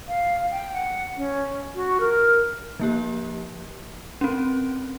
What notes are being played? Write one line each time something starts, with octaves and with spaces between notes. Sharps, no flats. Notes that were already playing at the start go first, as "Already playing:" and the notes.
F5
G5
F#5
C#4
F#4
A#4
F3 A#3 G4
C4 C#4